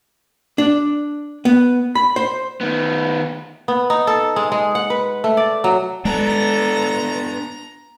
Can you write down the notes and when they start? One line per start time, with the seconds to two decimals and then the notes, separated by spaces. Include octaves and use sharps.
0.58 D4
1.45 B3
1.95 B5
2.16 C5
2.61 D#3 B3
3.68 B3
3.90 D#4
4.07 A4
4.36 G#3
4.52 G#3
4.75 F#5
4.90 B4
5.24 A3
5.37 D5
5.64 F#3
6.05 G#3 B3 D4 A4 A#5